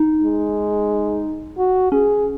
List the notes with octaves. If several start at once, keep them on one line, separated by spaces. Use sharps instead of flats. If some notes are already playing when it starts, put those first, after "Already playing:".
Already playing: D#4
G#3
F#4
C#4 G#4